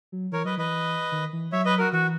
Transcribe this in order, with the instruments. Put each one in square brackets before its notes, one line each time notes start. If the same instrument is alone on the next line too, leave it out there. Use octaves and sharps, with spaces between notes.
[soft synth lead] F#3
[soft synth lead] E3 [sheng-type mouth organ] A#4 C#5
[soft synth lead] F#3 [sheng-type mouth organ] B4 D#5
[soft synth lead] E3 [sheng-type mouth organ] B4 D#5
[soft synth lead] D#3
E3
[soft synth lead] F#3 [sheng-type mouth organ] C#5 E5
[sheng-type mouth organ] B4 D#5
F#4 A#4
[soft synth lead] E3 [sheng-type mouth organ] F#4